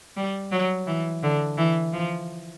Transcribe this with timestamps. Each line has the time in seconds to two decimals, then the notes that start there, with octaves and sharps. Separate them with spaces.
0.16 G3
0.51 F#3
0.87 E3
1.23 D3
1.57 E3
1.93 F3